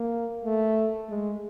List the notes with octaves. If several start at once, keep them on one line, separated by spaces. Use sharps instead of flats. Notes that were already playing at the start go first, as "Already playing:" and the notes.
Already playing: A#3
A3
G#3